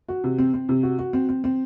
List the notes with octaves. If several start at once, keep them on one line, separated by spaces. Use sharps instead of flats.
F#4
C3
C4
C4
C3
F#4
F#4
C4
C4
C4